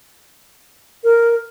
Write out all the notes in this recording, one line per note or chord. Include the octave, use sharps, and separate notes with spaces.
A#4